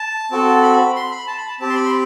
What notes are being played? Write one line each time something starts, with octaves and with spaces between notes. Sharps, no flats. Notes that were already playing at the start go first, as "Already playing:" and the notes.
Already playing: A5
C4 F#4 A4
B5
C6
B5
A5
B5
A5
C4 G4 A5
C6
B5
C6